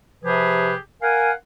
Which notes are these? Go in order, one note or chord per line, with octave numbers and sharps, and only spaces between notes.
C3 F3 G4 G#4 B4
A#4 F5 F#5 G#5